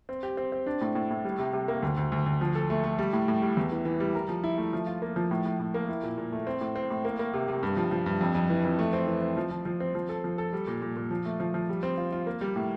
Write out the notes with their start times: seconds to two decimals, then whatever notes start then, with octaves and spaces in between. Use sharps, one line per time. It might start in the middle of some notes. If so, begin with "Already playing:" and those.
0.09 C4
0.23 G4
0.37 C4
0.52 C4
0.66 D4
0.81 A2
0.95 A2
1.10 A2
1.25 G3
1.39 C3
1.53 C3
1.68 A#3
1.82 D2
1.97 D2
2.12 D2
2.26 D2
2.41 F3
2.55 A4
2.70 A3
2.84 A3
2.99 G3
3.13 A2
3.28 A2
3.42 G3
3.57 E2
3.72 E3
3.85 E3
4.00 G3
4.15 A#4
4.29 F3
4.44 E4
4.58 A3
4.73 F3
4.87 F4
5.02 A#3
5.16 F3
5.31 A2
5.45 A2
5.60 A2
5.74 A#3
5.88 E4
6.03 A#2
6.18 A#2
6.32 A3
6.47 C4
6.61 A2
6.76 C4
6.90 A2
7.05 A#3
7.19 A#3
7.33 C3
7.48 C3
7.63 G2
7.77 F3
7.91 F3
8.06 G2
8.21 F2
8.35 F2
8.50 E3
8.64 F2
8.79 A3
8.93 C4
9.07 E3
9.22 C4
9.37 F3
9.51 F3
9.65 F3
9.80 C4
9.95 F3
10.09 A4
10.24 F3
10.38 A4
10.53 G3
10.67 A#2
10.82 A#2
10.97 A#2
11.11 F3
11.25 A3
11.40 F3
11.54 F3
11.69 G3
11.83 C4
11.97 F4
12.12 F4
12.27 A#3
12.41 G3
12.56 A2